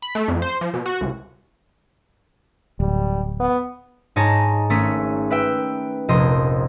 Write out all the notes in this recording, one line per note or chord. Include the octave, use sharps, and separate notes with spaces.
B5
A3
F2
C5
F3
B2
F#4
C#2
D1 G3
B3
G#2 D#4 C#5 G#5 A5 A#6
G#1 A3 C#4 G#4 B6
B4 E5 G5
F1 A#1 C5 D#5